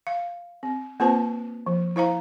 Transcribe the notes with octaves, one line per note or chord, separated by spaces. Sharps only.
F5
C4
A#3 C4 F4 B4 C5 A5
F3
E4 C5 F5 A#5